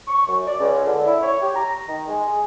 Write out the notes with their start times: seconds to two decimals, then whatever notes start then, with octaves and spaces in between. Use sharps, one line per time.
0.08 C#6
0.27 F#2
0.47 D5
0.60 C#2
0.86 D3
1.06 E4
1.22 C#5
1.42 G4
1.56 A#5
1.88 D#3
2.08 G#3
2.26 G#4